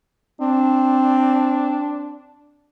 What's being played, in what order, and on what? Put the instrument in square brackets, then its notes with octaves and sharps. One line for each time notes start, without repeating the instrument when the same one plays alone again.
[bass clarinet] C4 [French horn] D4